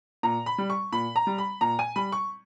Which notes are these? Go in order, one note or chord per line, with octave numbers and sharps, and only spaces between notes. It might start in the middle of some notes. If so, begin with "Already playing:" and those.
A#2 A#5
B5
G3
C#6
A#2 B5
A#5
G3
B5
A#2 A#5
G#5
G3 B5
C#6